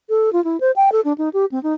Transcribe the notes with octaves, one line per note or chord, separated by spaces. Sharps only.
A4
F4
E4
C5
G5
A4
D4
D#4
G4
C4
D#4